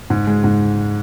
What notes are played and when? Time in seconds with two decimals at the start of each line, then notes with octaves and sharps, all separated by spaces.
0.10 G#2
0.27 G#3
0.44 G#2